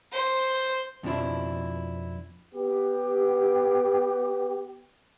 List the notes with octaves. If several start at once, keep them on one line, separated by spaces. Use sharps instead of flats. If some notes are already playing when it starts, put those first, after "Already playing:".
C5
F2 B2 F3 D4 E4
B3 G4